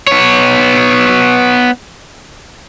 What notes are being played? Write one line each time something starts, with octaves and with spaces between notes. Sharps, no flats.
B3 C#5